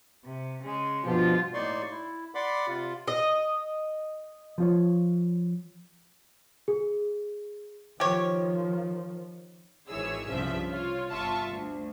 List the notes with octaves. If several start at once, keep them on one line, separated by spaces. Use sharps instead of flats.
C3
C#3 G#3
G2 B2 F3 F4 G4
A2 A#3 D#4 D5 C6 C#6
E4
D5 F#5 B5 C6 D6
C3 F4
D#5
F3 F4 C#5
G#4
D#3 F3 G4 C#5
G#1 D#3 E3 G#4 C#5 E6
C2 G2 C#3 F3 E5
F4 C#5
G1 F4 E5 A5 C#6
D2